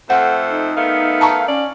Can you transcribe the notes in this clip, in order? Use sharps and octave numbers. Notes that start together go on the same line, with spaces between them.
F2 A3 C5 F#5
D#4
D#3 A3 B3 F5
A5 A#5 C#6
C#4 D5